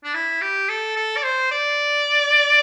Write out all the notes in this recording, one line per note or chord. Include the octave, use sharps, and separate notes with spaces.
D4
E4
G4
A4
A4
D5
C5
D5